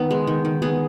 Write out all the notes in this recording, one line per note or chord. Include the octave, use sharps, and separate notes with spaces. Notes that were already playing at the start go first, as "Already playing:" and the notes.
Already playing: D#3 B3
G#3
D#3
D#3
B3 G#4